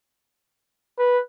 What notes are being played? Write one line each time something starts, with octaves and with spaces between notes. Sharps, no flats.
B4